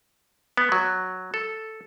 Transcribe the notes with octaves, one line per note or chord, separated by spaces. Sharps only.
B3
F#3
A4